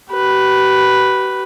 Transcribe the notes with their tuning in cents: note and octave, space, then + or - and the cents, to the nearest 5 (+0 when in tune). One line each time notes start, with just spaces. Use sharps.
G4 -45 B4 +0